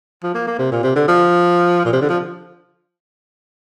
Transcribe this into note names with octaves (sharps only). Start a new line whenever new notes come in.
F3
A#3
A#3
C3
A#2
C3
D3
F3
A#2
C3
D3
F3